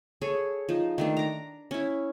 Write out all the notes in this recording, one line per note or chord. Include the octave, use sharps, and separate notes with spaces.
G#4 A4 C#5
F3 D#4
D#3 A3 D4
A#5 D6
C#4 E4